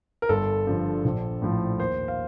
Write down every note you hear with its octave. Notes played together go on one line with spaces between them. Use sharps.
A#4
G1 A4
G2 D3 F3
A#1
A2 F3
D#2 C5
F5